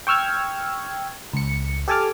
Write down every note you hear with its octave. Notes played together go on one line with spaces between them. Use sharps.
G5 C#6 E6 F6 G#6
C#2 C#7
G4 A4 G#5 A5 D6 F6